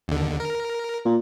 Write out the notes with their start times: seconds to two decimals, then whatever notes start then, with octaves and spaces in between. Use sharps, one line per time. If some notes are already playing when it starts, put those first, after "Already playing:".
0.08 D#2 D3
0.40 A#4
1.05 A#2